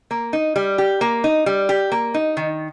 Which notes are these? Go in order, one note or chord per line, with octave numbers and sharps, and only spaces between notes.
A#3
D#4
G3
G4
A#3
D#4
G3
G4
A#3
D#4
D#3